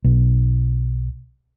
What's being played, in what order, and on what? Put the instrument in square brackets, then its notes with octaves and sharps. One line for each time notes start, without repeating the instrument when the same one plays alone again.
[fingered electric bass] B1